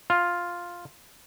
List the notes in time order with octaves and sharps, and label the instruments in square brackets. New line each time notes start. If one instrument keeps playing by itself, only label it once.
[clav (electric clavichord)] F4